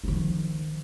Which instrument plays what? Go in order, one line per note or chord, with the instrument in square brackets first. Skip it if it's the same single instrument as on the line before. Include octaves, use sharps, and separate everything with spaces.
[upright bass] D#3 F3